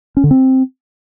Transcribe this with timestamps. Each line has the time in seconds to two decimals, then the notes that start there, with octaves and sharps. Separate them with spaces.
0.17 C#4
0.24 D3
0.31 C4